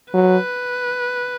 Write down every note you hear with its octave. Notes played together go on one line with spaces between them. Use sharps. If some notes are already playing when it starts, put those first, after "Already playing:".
F#3 B4